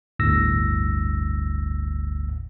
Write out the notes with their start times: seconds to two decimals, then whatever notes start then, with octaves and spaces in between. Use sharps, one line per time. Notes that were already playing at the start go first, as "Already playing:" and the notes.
0.19 G1 D2 A2 E6 A#6